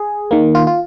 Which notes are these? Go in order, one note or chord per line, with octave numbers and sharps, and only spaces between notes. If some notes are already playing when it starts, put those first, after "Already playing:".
Already playing: G#4
D#3 A#3
F4
F4